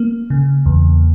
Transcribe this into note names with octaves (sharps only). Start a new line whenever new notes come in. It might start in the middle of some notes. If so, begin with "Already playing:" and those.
Already playing: A#3
C#3
E2